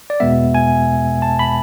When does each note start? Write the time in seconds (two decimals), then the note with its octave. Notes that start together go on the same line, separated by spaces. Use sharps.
0.10 D5
0.20 E2 B2 G#3 B3 E5
0.55 G#5
1.22 A5
1.39 B5